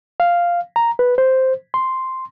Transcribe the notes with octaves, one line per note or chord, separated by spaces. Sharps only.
F5
A#5
B4
C5
C6